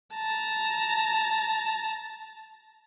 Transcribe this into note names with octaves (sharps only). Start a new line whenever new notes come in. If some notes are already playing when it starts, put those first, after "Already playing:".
A5 A#5